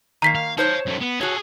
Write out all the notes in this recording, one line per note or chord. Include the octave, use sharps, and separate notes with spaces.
D#3 A#3 A#5 B6 C7
F5
D#4 C5 C#5 F5 A5
F#2 A3
B3
F#4 G#4 A4 C#5